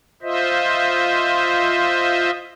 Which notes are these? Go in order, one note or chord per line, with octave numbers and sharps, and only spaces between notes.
F4 C5 D#5 E5